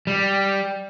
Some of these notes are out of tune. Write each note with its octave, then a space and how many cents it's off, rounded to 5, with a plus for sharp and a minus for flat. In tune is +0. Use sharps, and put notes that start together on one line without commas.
G3 +0